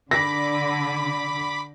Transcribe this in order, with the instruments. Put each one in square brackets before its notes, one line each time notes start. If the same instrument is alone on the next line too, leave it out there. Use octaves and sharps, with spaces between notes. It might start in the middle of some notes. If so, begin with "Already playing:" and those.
[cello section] D3 [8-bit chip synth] B5 D6 B6 [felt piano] A#6